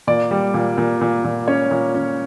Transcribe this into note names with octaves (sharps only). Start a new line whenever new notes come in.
A#2 D5
G3
A#2
A#2
A#2
A#2
C#4 C#5
A#2
C#4